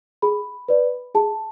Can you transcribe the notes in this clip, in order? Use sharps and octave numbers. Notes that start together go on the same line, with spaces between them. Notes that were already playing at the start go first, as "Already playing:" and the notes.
G#4 B5
B4 D5
G#4 A5